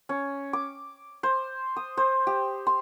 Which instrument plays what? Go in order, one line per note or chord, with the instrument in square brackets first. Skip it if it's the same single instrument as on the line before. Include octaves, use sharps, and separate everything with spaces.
[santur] C#4
D6
C5
D#6
C5
G4
C6